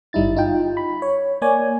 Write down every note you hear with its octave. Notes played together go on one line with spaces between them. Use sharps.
G1 G3 D#4 E4 A6
D#4 F4 G5
B5
C#5
A#3 C#5 D5 G#5